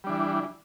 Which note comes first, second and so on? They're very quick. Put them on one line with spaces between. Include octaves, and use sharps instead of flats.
G3 D4 E3